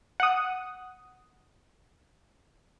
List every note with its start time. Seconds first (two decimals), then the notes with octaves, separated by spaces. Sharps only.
0.20 F#5 D#6